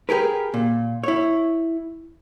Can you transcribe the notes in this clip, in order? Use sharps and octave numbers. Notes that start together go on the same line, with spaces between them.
G4 G#4 A#4 B4
A#2
E4 C#5